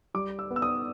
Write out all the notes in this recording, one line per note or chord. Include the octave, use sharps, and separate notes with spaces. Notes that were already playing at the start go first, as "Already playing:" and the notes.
G3 D6
E6
B3
E6
D#6